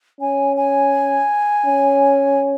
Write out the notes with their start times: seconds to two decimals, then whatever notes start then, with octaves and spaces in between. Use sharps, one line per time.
0.21 C#4 G#5
0.57 G#5
1.66 C#4